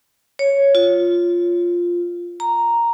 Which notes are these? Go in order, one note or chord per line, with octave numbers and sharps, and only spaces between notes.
C#5
F4
A#5